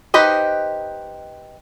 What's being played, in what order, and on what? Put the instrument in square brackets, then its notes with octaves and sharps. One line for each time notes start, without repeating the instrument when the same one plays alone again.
[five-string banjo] D#4 G4 B4 C5 D#5